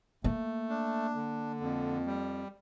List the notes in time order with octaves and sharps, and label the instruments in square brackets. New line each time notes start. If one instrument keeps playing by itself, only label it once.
[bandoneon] A3 [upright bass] A#3
[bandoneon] D4
D3
F2
G3